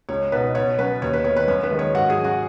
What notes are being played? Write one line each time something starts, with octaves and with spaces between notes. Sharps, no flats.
C#2 C#5
B2 B3 D#4 B4
B2 C#5
F#3 C#4 B4
D#2 C#5
B4
D#3 B3 C#5
B4
F#2 C#5
B4
D#3 G#3 D#4
C#5
G#2 F#4 F#5
G#4 G#5
F#3 C#4
F#4 F#5